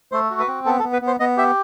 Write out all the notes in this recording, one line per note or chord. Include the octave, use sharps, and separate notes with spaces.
A3 C5
F#4
B4
C4
B3 A4
A4
B3
B4
B3
C5
B3 D#5
G4 E5